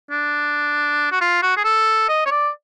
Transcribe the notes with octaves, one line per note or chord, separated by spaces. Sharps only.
D4
F#4
F4
F#4
G#4
A4
D#5
C#5
D5